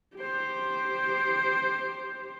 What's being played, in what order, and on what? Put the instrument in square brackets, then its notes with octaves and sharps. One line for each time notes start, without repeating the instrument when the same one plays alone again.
[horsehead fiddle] G4 C5